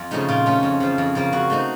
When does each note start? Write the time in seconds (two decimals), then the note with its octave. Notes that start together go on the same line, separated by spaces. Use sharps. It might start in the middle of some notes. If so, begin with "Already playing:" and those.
Already playing: F2 F4
0.11 C#3 F3 A3 D#4
0.28 A#2 F4
0.46 A3 C#4 F4
0.63 F2
0.80 C#3 F3
0.98 F2
1.15 C#3 F3 A#3
1.32 C#3 F#4
1.50 A3 C4 D#4